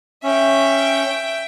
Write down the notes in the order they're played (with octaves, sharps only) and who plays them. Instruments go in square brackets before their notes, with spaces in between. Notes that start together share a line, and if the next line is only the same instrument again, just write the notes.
[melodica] C#4 [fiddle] E5 G5